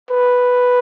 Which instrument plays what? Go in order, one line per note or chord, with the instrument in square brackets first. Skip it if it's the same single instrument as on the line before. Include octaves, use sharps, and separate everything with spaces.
[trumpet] B4